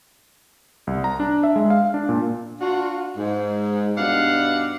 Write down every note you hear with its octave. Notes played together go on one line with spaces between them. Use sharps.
C2
A#5
D4
E5
G#3
F5
D4
A#2
D4 F4 F#4
G#2
G2 B2 D#4 D5 F5 F#5